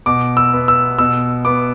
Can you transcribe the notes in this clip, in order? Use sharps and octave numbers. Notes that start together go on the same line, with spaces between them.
B2 D6
E6
B3
E6
B2 E6
B3 D6